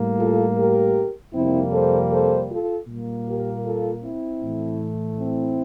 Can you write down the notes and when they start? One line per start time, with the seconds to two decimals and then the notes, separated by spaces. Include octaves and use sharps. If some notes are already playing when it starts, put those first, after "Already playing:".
Already playing: A2 G3 A#3
0.19 F4 A4
0.58 G4 A#4
1.34 F2 C3 G3 A#3 C4 E4
1.73 A4 C5
2.11 A4 C5
2.50 F4 A4
2.88 A#2 G3 A#3
3.27 G4 A#4
3.65 F4 A4
4.03 C4 E4
4.42 A2 E3 A3
5.19 C4 E4